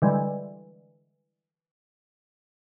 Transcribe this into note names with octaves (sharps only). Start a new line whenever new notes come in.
D3 E3 G3 G#3